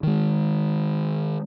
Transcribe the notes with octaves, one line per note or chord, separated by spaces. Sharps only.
D#3 G#3